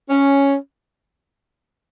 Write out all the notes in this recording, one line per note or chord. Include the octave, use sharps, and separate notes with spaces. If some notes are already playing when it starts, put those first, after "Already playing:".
C#4